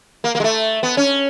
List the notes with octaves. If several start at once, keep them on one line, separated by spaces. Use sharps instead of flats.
A#3
A#3
G#3
A3
B3
C#4